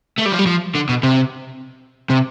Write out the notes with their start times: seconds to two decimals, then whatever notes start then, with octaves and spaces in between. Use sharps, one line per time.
0.18 A3
0.25 G3
0.32 F3
0.39 G3
0.46 F3
0.75 D3
0.89 B2
1.03 C3
2.10 C3